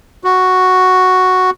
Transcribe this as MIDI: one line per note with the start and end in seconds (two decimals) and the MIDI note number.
0.24 1.50 66